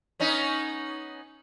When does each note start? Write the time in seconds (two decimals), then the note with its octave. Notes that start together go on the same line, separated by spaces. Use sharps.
0.20 B3 C#4 D#4